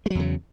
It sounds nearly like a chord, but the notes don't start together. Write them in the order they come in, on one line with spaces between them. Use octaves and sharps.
G#3 F#3 E2 C#3